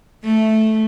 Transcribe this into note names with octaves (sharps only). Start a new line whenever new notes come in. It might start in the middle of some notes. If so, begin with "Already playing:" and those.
A3